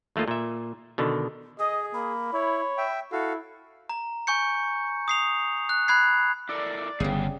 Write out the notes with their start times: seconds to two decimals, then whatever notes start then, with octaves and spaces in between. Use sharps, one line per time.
0.16 D#2 A3 A#3 F4 D#5
0.28 A#2 E5
0.98 B2 D3 D#3
1.59 G#4 D#5 D#6
1.94 A#3 B5
2.33 E4 C#5
2.78 E5 G5
3.12 E4 F#4 A4 F5
3.89 A#5
4.27 G#5 C#6 G6 C#7
5.08 D#6 C7 F7
5.69 F#6
5.88 B5 F#6 G#6 C7
6.49 E4 A4 A#4 D5
7.00 G1 C#3 G3 B3 G#4